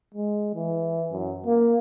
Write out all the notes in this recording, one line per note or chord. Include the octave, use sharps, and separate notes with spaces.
G#3
E3
F#2
A#3